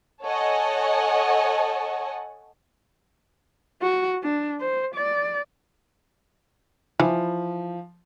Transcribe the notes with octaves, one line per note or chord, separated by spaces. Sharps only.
A4 C#5 D#5 F#5 G#5
F#4
D4
C5
D5
E3 F3